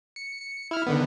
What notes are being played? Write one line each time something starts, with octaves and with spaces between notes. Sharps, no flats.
C#7
C#7
E4 F6
D3 D#3 B3